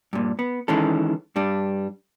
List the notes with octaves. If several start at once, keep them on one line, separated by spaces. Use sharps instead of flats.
G2 A#2
B3
D#3 E3 G#3 C#4 A4
G2 G3 D4